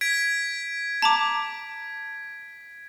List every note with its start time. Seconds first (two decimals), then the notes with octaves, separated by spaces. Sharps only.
0.01 G#6 B6 D7
1.02 A5 A#5 D6